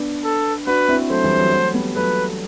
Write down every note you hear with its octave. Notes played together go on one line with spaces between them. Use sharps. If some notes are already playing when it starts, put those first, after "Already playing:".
Already playing: B3 D4
A4
D4 F#4 B4
C4 E4
F#3 A3 C5
E3 G3
F#3
F#3 A3
G3 B3
F#3 A3 B4